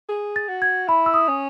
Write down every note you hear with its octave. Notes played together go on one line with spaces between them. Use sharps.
G#4
A6
F#4
G#6
E4 B5
E6
D#6
C#4